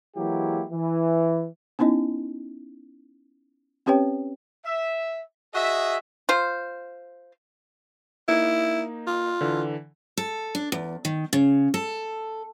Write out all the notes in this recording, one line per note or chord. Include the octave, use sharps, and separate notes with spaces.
E3 F#3 G#3 A#3 E4 G4
E3
B3 C#4 D#4 E4 D#5
C4 C#4 G4 B4 C#5 G5
E5
F#4 G#4 D#5 E5
F4 C5
A#3 D#4 E4
F4
D3 E3
A4
D4
E2
D#3
C#3
A4